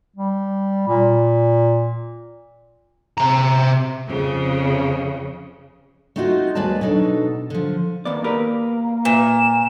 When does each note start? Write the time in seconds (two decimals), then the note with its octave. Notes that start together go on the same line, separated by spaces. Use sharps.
0.16 G3
0.88 A#2
3.18 C3 A#5
4.08 F2 C#3
6.16 A3 C4 D#4 F4 F#4
6.55 D#2 G#3 B4 D5 A5
6.81 B2 F#3 D4 D#4 A4
7.50 D3 F3
8.05 D#2 A#3 B3 D5
8.24 G4 A#4 B4
9.05 A#2 B4 E5 E7